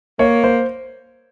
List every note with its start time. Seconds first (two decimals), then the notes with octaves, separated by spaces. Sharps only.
0.19 A#3 C#5
0.44 C5